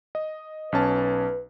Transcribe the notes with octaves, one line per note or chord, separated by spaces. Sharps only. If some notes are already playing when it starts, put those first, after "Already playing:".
D#5
B1 C#4 B4 A5